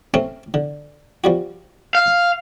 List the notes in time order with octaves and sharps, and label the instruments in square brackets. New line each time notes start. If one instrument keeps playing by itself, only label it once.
[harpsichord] A3 C4 C#4
D3
F3 G3 F#4
[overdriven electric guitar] F5